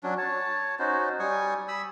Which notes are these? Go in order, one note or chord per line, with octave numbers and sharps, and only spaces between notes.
F#3 C#4 D4
C#5 A5
C#4 D#4 F#4 C5
G3 G#5 C#6 D#6
B5 D#6 E6